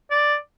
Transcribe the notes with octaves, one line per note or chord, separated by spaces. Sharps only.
D5